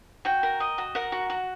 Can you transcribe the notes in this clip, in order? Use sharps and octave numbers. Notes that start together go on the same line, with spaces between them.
F#4 G5
A#4
D#5
F#4
A#4 F#5
F#4
F#4